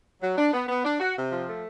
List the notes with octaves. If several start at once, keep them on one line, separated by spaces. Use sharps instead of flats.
F#3
D4
B3
B3
D4
F#4
C3
F3
A3